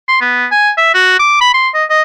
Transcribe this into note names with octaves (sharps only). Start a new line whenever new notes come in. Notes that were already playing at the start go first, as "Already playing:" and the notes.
C6
B3
G#5
E5
F#4
D6
B5
C6
D#5
D#5